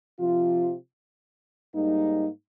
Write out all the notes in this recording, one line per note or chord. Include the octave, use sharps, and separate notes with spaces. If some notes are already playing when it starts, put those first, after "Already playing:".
C3 F3 C4 F4
G#2 G3 A#3 D#4